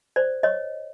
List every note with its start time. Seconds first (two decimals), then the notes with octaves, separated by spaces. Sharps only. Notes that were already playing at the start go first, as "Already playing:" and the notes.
0.16 C5 D5
0.43 C#5 D#5